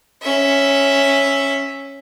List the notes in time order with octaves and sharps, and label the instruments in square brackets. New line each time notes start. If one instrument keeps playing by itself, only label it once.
[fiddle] C#4 E5